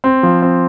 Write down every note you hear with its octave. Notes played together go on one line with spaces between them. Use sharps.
C4
F3
C4